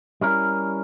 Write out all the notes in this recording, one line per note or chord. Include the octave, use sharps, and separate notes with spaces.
G3 C#4 E4 A#4